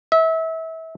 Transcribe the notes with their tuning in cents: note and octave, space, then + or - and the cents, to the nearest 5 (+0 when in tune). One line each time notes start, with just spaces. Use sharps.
E5 -30